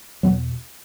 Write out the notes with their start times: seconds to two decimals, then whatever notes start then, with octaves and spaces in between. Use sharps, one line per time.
0.23 E2 B2 F#3 B3